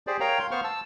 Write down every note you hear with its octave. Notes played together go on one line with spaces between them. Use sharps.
G4 G#4 C5 D5
A#4 C#5 F5 G5 A#5
F5 C6
B3 C5 F5 C#6 F6
A5 E6